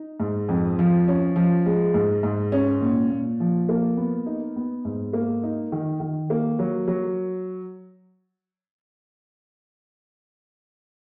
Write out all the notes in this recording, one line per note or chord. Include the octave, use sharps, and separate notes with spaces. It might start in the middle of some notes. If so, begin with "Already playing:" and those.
Already playing: D#4
G#2
F2
F3
C#4
F3
G#3
G#2
G#2
C#4
A#2
A#2
F3
A#3
B3
D#4
B3
G#2
A#3
D#4
D#3
D#3
A#3
F#3
F#3